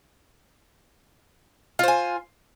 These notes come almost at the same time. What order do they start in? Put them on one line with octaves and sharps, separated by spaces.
F4 C5 G#5